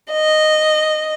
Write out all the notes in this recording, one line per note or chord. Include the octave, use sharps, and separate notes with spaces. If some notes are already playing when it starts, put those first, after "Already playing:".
D#5